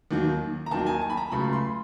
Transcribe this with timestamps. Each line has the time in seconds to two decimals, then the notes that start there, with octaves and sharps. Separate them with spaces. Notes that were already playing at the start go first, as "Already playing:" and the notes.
0.11 D#2 D#3 F#3
0.66 A#5
0.71 D#2 D#3 F#3 A5
0.86 G#5
1.01 A5
1.10 B5
1.17 A#5
1.31 C#2 C#3 F#3 A3 B5
1.53 C6